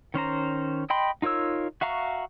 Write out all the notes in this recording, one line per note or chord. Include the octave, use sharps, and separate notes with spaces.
D#3 C#4 C5 A#5
D#5 G5 B5 C6
D#4 F4 A#4 C#5 E6
F#4 E5 F5 A#5 C#6